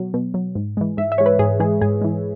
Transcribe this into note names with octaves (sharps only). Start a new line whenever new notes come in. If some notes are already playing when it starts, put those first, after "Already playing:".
Already playing: B2 F#3
B2
F#3
G#2
E3 G#3
G#2 E5
E5
E3 G#3 C#5
B4
G#2 G#4
E3 G#3 G#4
G#2 G#4
E3 G#3